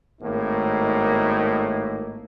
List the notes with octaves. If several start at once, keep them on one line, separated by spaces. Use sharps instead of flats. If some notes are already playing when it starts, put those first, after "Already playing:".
G#1 A2 A#3 D#4